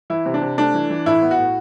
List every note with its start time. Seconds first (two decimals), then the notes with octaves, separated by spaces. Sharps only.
0.10 E3 E4
0.26 C3
0.34 D4
0.41 C3
0.58 A3 D4
0.74 E3
0.90 E3
1.06 A2 E4
1.22 B3
1.31 F#4
1.39 A2